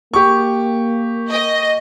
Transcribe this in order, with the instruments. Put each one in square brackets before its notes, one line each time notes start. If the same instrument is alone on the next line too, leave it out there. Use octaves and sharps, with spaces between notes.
[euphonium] A#3 [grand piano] G4 C#6
[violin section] D#5